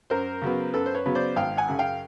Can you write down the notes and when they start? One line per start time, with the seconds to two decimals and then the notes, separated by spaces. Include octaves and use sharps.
0.10 F#2 A#4 C5
0.41 C#3 F#3 B3
0.74 F#2 A4 B4
0.86 C5
0.95 B4 C#5
1.05 C#3 F#3 B3
1.15 C5 D5
1.36 G#1 F5 G5
1.57 F#5 G#5
1.68 F#2 C#3
1.79 F5 G5